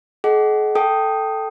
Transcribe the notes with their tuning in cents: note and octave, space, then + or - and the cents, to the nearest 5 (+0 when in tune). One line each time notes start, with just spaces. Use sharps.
G#4 +45 D#5 +0 F#5 +25
A4 +0 G5 +0 D#6 +0